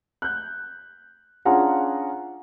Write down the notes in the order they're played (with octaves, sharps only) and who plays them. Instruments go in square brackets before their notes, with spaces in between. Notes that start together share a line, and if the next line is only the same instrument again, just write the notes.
[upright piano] F#6 G6
C#4 D4 F4 G#4 F#5 A#5